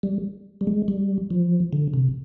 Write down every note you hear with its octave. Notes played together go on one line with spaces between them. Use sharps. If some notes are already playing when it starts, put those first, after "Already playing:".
G3
G3
G#3
G3
F3
D3
C3